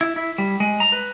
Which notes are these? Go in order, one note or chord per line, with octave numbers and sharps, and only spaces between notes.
E4
E4
G3
G#3
A#5
B4